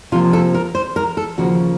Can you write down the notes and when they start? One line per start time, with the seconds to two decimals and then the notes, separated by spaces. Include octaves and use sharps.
0.12 C3 F3 A#3 F4
0.33 A4
0.54 A#4
0.75 C5
0.96 A#4
1.17 A4
1.38 D#2 C#3 F3 A#3 F#4